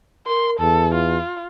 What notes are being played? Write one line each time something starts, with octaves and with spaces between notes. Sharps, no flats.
A#4 C6
E2 A4
F4